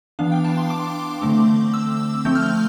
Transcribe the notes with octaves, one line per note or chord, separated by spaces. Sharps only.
E3 B3 D4 F5
G5
A5
C6
D6
D3 A3 C4
E6
F3 A3 C4 G6
F6
G6